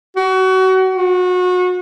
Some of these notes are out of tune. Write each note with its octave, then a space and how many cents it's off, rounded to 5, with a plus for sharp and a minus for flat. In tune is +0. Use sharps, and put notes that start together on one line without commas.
F#4 +30
F#4 -30